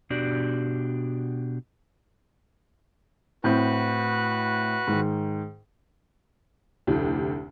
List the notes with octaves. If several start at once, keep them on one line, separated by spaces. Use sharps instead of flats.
B2 D4 F#4 G4 D5
A2 C4 F#4 B4 F#6 G6
G#2 D#3
F1 D2 A2 G4